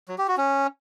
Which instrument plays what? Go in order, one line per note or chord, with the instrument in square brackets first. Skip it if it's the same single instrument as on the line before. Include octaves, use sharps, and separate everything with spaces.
[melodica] F#3
G4
F#4
C#4